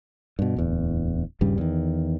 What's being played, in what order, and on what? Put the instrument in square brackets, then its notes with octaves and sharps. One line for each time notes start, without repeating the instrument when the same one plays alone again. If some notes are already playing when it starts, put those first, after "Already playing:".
[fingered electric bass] G2 B2
D1 E2
D#1 G2 C#3 G3
E2 D#3